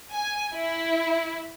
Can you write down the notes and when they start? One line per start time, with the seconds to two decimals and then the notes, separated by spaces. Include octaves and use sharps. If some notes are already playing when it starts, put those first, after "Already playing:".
0.14 G#5
0.53 E4